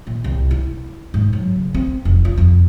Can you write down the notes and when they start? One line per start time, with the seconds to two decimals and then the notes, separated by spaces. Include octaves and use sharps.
0.07 A#2
0.24 C2
0.51 E4
1.14 G#2
1.33 F#3
1.56 C#3
1.74 C4
2.05 F1
2.25 F4
2.38 F2